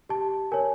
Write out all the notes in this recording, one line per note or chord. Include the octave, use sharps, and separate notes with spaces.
G4 A5
A#4 C#5 G#5